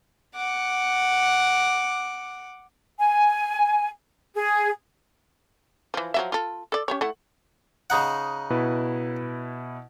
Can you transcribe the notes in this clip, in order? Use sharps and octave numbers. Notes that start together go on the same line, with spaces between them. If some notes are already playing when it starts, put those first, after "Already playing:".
F#5 D6
G#5
G#4
E3 F3
F3 F#3 E5
F4 A4
A4 D5
C#4 G4 C#5
A3 E4 F#5
C#3 D#4 F#5
B2 E4 B4